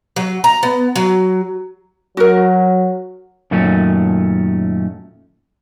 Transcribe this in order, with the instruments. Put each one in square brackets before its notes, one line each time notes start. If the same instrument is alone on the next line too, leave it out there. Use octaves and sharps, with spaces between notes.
[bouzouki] F#3
A#5
B3
F#3
[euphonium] F#3 [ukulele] F#4 A#4
[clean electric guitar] F#2 A#2 D#3 A3 C#4